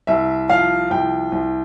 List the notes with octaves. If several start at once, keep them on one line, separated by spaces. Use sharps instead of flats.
C2 E5
F3 F5
C2 G5
C2